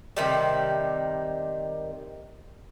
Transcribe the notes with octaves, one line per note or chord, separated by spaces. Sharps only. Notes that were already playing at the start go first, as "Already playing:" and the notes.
C3 D#3 G3